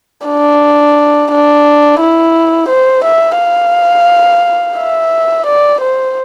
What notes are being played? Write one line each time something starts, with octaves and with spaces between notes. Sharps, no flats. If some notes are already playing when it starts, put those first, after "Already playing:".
D4
D4
E4
C5
E5
F5
E5
D5
C5